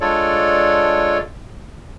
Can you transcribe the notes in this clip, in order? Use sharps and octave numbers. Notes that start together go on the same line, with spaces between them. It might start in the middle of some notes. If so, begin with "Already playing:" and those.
G#3 D4 F4 A4 C#5 D5